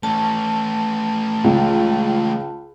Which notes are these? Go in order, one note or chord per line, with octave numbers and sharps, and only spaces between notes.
A3 C#4 A5
C#2